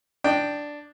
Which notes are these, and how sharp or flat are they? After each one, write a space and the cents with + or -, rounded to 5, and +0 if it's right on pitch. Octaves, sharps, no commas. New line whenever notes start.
D4 +0 D#5 -25 G5 +0